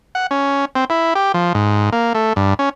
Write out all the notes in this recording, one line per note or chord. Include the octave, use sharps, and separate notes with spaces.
F#5
C#4
C4
E4
G4
F3
G#2
A#3
A3
G2
C#4